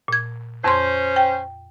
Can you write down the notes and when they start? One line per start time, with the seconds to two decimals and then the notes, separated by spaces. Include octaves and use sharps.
0.08 A#2 G#6
0.64 F2 C#4 C5 C6
1.16 G5